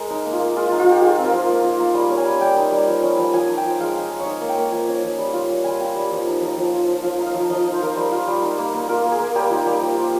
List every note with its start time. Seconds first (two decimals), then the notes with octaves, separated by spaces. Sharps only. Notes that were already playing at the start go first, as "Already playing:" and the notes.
Already playing: G#3 A#4
0.10 D#4
0.25 A#3
0.33 F4
0.40 A#3
0.56 G#3 F4
0.68 D#4 F4
0.79 F4
0.87 G#3 G4
1.02 D#4 G#4
1.18 C4
1.26 A#4
1.33 F3
1.49 A#3
1.63 F4
1.79 A#3
1.94 G3
2.10 C#4
2.18 G#5
2.25 G3
2.41 G3 G5
2.57 D#4
2.72 G3
2.88 F3
3.02 C#4
3.18 F3
3.34 F3 G#5
3.49 D#4
3.57 G5
3.64 F3
3.80 G#3 F5
3.95 D#4
4.11 G#3
4.20 C#5
4.26 D#4 D#5
4.41 A#3
4.49 G5
4.57 A#3
4.72 F3 G#5
4.88 C#4
5.03 F3
5.18 G3
5.33 F4
5.50 G3
5.64 G3 G#5
5.81 F4 G5
5.96 G3
6.12 F3
6.27 D#4
6.41 F3
6.57 F3
6.73 F4
6.88 F3
7.03 F3 F5
7.18 D#4
7.26 F5
7.34 F3
7.50 F3 D#5
7.66 D#4
7.73 C5
7.81 F3 A#4
7.91 C5
7.96 G3
8.12 F4
8.28 G3
8.42 D#4
8.58 A#3
8.74 A#3
8.88 F4 A#4
9.04 A#3
9.12 G#4
9.19 A#3
9.35 G3 G4
9.50 D#4 F4
9.66 G3 G4
9.81 F3
9.96 F4